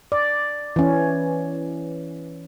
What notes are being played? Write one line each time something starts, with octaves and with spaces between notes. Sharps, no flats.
D5
E3 C#4